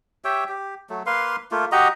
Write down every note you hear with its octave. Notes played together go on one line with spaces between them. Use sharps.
G4 C#5 E5 G5
G4
F#3 A3
A#3 B4 F5 C6
A3 A#3 F4
F#4 G4 D#5 A#5